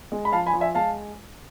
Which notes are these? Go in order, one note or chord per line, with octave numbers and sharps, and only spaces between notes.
G#3
B5
F3 F5 A5
G#5 B5
F3
E5 G#5
G#3 F5 A5